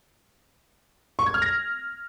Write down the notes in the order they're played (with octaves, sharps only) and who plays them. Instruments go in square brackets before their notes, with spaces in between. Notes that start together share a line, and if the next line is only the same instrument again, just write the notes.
[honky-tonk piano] C#6
G#6
F6
A#6